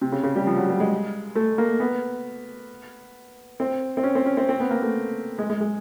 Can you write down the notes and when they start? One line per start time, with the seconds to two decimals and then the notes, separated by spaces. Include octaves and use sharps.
0.01 C3
0.12 C#3
0.23 C#3
0.36 G3
0.47 F3
0.57 F#3
0.69 G3
0.80 G#3
1.35 A3
1.58 A#3
1.80 B3
3.60 C4
3.97 C4
4.03 C#4
4.15 C4
4.26 C#4
4.37 C4
4.49 C4
4.60 B3
4.71 A#3
4.82 A3
5.39 G#3
5.50 G#3
5.61 G#3